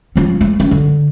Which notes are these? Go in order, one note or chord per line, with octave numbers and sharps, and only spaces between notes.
F3 C#4
A3
C#4
D3